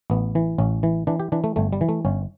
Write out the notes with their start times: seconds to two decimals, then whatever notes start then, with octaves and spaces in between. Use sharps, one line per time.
0.10 A1 B3
0.35 E3
0.58 A1 C#4
0.83 E3
1.07 E3 D4
1.20 G4
1.32 E3 D4
1.44 A3
1.56 G1 A3
1.73 G3
1.81 E3
1.89 A3
2.05 G1 C#4